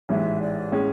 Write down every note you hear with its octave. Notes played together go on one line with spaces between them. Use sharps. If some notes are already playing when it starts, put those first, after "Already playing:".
A1 G#2 E3 G#3 E5
D5
A2 G#3 C#4 G#4